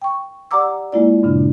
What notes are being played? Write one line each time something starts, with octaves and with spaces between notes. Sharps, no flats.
G5 C#6
G4 D5 F#5 A#5 D6 E6
G#3 A#3 E4 F4 D5
G2 A#2 C#3 D4